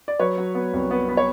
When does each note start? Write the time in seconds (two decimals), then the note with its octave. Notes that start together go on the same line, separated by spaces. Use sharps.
0.08 D5
0.20 F#3 B4 C#5
0.38 F#3
0.55 B3
0.73 C2
0.91 B3
1.09 B3
1.17 C#5